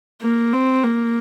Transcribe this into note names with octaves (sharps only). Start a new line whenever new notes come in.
A#3
C4
A#3